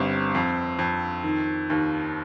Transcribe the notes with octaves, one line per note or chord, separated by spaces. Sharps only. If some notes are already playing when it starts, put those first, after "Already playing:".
Already playing: G1 G3 C4
F2
F2
D#3
D#2